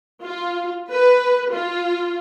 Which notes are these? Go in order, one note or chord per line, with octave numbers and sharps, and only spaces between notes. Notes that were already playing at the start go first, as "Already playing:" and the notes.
F4
B4
F4